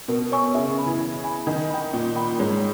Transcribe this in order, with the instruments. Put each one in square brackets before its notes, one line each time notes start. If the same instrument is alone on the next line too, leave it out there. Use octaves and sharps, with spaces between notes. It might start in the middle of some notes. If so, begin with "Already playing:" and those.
[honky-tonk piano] B2 [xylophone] A#4
[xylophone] C#5 G#5 C#6 E6
[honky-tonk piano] C#3 [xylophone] E5
[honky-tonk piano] C#3
[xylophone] G#5 B5
[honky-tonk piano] E3
[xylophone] E5
G#5 B5
[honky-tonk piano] D#3 [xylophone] D#5
[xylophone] G5 B5
[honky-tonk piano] A#2 [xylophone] D#5
[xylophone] G5 B5
[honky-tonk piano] G#2 [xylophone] C#5